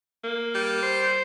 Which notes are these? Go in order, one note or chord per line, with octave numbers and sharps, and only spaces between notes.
A#3
G3
C5